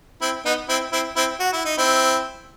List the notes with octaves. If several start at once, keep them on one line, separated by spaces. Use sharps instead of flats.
C4 E4
B3 D#4
C4 E4
C4 E4
C4 E4
F#4
E4
D#4
C4 E4